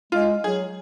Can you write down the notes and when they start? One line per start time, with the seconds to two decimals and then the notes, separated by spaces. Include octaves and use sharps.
0.12 G#3 F4
0.44 F#3 G#4